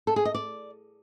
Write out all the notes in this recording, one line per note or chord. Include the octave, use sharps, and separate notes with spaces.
A4
G#4
D#5
D5